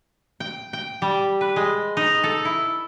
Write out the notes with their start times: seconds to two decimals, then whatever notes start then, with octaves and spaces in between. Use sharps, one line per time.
0.40 G5
0.73 G5
1.02 G3
1.41 B4
1.56 G#3
1.97 D#4
2.24 A4
2.45 E4